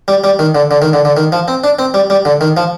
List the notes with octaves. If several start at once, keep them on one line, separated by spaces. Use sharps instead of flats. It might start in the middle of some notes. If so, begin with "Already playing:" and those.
G3
G3
D#3
D3
D3
D#3
D3
D3
D#3
F3
C4
D4
C4
G3
G3
D3
D#3
F3